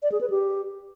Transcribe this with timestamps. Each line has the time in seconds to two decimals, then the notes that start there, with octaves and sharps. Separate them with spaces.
0.03 D5
0.12 G#4
0.21 B4
0.30 G4